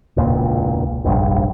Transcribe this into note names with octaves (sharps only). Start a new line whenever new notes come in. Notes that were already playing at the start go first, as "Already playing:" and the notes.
E1 C#2 A#2
F1 A#1 G2